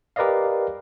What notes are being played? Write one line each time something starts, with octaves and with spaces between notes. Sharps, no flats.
G4 A#4 B4 D5 D#5 F5